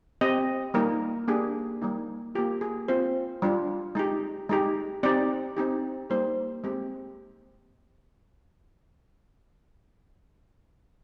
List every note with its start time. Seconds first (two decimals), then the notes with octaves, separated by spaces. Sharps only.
0.21 C4 G4 D#5
0.74 G3 A#3 D#4 A#4
1.28 A#3 D4 G4 G#4
1.82 G3 A#3 D#4
2.35 A#3 F4 G4
2.61 G#4
2.88 C4 F4 C5
3.42 G3 D4 F4
3.95 G#3 D#4 G4
4.49 G#3 D#4 G4
5.03 C4 D#4 G4 D5
5.57 C4 D#4 G4
6.10 G3 A#3 D#4 G4 C5
6.64 G#3 C4 G4